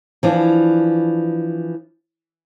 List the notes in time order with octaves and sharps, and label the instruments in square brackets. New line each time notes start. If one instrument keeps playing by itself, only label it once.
[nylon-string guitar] E3 F3 D4